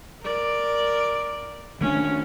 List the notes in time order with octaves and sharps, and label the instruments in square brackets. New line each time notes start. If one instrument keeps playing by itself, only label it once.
[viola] A#4 D5
[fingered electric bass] D#3 A3 D4 [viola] C#4